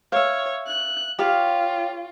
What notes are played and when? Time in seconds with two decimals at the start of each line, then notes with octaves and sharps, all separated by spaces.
0.12 C#5 E5 F5
0.67 F#6
1.19 F4 G4 C#5 F5